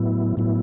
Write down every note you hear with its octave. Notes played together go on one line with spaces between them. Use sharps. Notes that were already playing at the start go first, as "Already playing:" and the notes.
Already playing: A2 F#3 B3 E4
A2 F#3 B3 E4